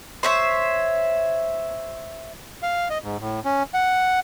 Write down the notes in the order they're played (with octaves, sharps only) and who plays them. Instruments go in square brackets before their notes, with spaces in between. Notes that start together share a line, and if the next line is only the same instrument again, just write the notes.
[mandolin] C5 C#5 E5
[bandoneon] F5
D#5
G#2
A2
C#4
F#5